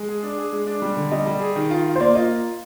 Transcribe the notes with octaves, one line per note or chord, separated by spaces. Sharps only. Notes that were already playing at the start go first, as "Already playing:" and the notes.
Already playing: G#3
G#4
D4
G#4
G#3
D4
G3
D3
G3 D#5
G3
G#4
D#3
F4
F4
C5
A#3 D5
F4 D#5